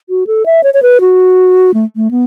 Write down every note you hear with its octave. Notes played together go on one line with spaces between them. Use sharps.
F#4
A4
E5
C#5
C#5
B4
F#4
A3
A3
B3